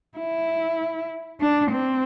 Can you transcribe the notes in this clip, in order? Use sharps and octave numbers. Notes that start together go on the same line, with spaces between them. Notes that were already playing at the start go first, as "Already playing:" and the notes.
E4
D4
C4